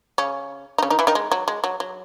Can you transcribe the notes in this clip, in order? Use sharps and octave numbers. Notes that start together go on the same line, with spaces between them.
C#3 C#4
D#4
C#3 C#4
D#3 D#4
E3 E4
D#3 D#4
G#3
F#3
G#3
F#3
F#3